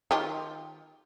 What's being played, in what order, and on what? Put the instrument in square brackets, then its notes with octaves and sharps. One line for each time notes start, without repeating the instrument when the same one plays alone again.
[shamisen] D#3 F4 G4